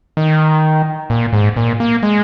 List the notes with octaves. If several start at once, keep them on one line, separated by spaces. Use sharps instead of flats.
D#3
A#2
G#2
A#2
A#3
G#3